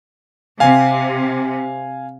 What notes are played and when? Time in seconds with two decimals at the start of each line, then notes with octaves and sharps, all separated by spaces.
0.60 C3 F5 G#5